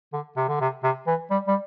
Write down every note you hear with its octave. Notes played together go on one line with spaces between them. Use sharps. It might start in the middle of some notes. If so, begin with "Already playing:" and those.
D3
C3
D3
C3
C3
E3
G3
G3